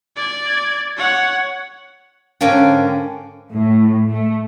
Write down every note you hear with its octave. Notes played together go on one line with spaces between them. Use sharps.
D5 G#6
C#5 F#5
G#2 D3 C#4 A#4 F5 G5
A2
A3